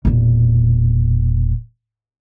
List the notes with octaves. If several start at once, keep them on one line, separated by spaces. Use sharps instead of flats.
E1 A#2